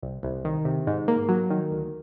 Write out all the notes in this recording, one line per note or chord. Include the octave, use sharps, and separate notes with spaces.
C2
C2
D#3
C3
G#2
A#3
F#3
D#3
D2